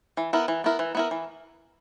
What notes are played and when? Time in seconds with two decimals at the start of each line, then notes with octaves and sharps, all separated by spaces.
0.17 E3
0.33 B3 E4 A#4
0.48 E3
0.64 B3 E4 A#4
0.79 E3
0.95 B3 E4 A#4
1.11 E3